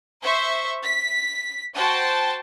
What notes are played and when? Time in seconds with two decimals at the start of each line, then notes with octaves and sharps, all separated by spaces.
0.22 C5 E5 C#6
0.84 B6
1.75 F#4 C5 G5 A5